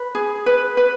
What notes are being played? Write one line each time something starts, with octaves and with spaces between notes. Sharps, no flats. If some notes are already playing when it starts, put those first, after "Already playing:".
Already playing: B4
G#4
B4
B4